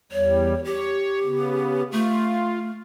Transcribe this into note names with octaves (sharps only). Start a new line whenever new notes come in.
E2 G3 C#5
G4 C#5
C#3 B3
A3 F4